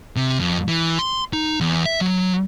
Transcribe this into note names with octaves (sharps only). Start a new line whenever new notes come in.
C3
F2
E3
C6
D#4
E2
E5
F#3